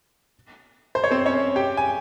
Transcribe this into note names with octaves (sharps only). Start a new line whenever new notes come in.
C5
C#5
C4 C5
C#4 C#5
G4 G5
G#5